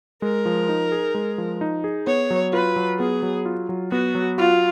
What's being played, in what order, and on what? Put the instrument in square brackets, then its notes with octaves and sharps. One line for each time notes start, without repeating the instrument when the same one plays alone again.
[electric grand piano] G#3 [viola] A#4
[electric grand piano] F3
D#4
G#4
G#3
F3
D#4
G#4
[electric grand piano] B3 [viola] C#5
[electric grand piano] F#3
[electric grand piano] F4 [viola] B4
[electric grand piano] F#3
[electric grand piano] B3 [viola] G#4
[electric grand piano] F#3
F4
F#3
[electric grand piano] B3 [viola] F#4
[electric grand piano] F#3
[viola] F4 [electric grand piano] F#4